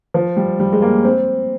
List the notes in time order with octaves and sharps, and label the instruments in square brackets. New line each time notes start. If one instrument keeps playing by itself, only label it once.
[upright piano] F3
G3
G3
G#3
A#3
C4